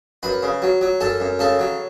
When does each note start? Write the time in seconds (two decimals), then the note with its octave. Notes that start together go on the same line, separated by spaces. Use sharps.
0.23 F#2 B4
0.43 C#3
0.62 F#3
0.81 F#3
1.01 F#2 A4
1.20 F#2
1.39 C#3 A4
1.59 F#3